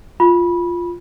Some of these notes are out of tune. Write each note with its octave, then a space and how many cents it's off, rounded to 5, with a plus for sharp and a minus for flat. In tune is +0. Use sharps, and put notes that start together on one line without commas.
F4 +0 B5 -20